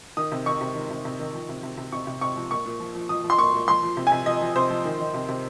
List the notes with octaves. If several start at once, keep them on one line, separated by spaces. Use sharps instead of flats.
D#3 D#6
C3
D#3 C#6
C3
D#3
C3
C3
D#3
F3
C3
C3
C3
C3 C#6
C3
C3 C#6
F3
A#2 C#6
A#2
F3
F3
F3 D#6
F3
C6
A#2 C#6
A#2
F3 C6
F3
C3
G#5
C3
F3 D#5
F3
C3 C5
F3
D#3
D#3
C3
C3